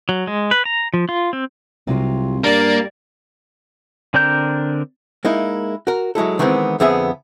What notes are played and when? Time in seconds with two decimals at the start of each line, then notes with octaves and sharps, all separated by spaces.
0.09 F#3
0.27 G#3
0.51 B4
0.65 A#5
0.94 F3
1.09 F4
1.33 C4
1.87 C2 C3 F#3 F4
2.44 G2 G3 A#3 D5
4.14 D3 C4 D4 A#4 G6
5.25 G#3 A#3 D#4 E4
5.87 F#4 A#4
6.15 F#3 G#3 E4 A4
6.39 D#3 E3 G#3 A3 B3 C4
6.80 F2 D3 B3 C4 G#4 E5